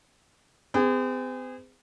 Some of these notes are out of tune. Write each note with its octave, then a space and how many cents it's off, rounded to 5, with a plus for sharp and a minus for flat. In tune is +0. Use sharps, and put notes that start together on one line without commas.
C4 -45 G#4 -25